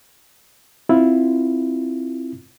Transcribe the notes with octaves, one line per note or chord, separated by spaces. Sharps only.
C4 E4 F4